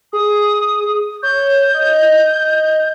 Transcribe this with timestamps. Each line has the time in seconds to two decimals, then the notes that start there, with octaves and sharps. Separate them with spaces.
0.13 G#4 D#6
1.23 C#5 G6
1.74 D#5